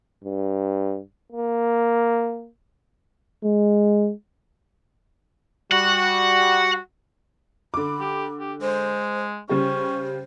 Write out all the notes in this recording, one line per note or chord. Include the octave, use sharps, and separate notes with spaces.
G2
A#3
G#3
G3 F#4 F#5
D3 B5 D6
G4
G4
G#3 C5
C#3 G3 C#4 G4 C5